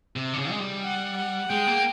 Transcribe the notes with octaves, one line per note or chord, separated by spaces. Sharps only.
C3
D3
C#3
G#3
G3
F#5
F#5
G#3 G5
A#3